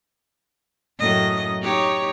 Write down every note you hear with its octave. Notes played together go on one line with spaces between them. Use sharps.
F#2 A2 D#5
D#4 G4 C#5